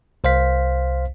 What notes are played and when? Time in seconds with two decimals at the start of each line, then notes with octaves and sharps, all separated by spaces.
0.24 C2 C5 F5 B6